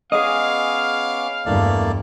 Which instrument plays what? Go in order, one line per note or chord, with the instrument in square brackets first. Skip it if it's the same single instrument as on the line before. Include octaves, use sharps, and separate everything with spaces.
[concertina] B3 C#4 D6 [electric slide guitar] G#4 D#5 [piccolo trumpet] F5
[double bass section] E2 G2 [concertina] A3 A#3 D5